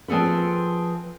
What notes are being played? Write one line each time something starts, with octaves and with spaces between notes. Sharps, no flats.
F3 C4 G#4 A4 B4